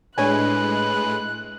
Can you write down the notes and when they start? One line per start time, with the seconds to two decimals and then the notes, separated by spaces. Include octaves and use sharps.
0.18 A2 G#3 D4 B4 C#5 G#5 F#6